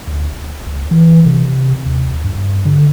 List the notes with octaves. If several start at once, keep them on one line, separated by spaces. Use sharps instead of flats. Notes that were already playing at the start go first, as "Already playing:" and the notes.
D2
D#1
C#2
E3
C3
D#2
G2
D3